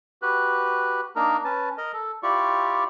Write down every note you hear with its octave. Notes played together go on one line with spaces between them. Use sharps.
F#4 G4 B4 F#6
A#3 D4 D#4 A#4
C#4 B4 A5
A#4 D#5
A4
E4 F4 G4 D5 C#6